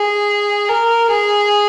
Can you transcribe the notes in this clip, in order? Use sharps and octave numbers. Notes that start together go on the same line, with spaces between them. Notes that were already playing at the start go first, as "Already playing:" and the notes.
Already playing: G#4
A#4
G#4